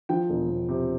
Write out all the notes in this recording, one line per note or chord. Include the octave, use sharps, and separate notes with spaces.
F3 G5
E1
E1
C3